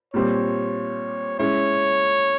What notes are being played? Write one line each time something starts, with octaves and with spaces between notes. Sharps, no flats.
A#2 G3 C4 C#5
G#3 C#4 E4 C#5